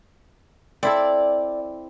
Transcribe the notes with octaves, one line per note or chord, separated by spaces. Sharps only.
C4 E4 A4 D5